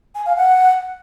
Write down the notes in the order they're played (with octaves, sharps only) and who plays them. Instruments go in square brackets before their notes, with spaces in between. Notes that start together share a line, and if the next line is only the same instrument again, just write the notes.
[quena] G#5
F5
F#5